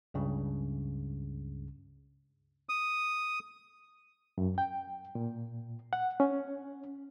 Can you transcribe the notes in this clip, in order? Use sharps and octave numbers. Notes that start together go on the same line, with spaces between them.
C#2 G2 C#3
D#6
F#2
G5
A#2
F#5
C#4